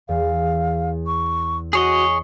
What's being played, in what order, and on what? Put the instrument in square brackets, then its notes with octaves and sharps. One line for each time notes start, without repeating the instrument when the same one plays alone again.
[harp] E2 [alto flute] F5
[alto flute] C#6
[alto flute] F#4 [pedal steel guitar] G#4 C#5 D#5